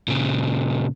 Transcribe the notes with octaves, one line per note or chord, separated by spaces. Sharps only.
A#2 C#3